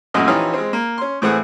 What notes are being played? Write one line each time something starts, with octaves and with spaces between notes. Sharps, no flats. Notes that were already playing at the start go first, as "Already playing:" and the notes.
A1 F#2 A#2 A3 F#4 D#5
E3 F3 C#4 D#4 F4 G4
G#3 C4
A#3
C#4 C6
A2 E3 A3 C4 G#4 F#5